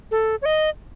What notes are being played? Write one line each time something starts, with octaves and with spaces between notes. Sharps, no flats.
A4
C#5
D#5